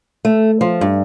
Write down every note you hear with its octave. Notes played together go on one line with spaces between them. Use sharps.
A3
F3
G2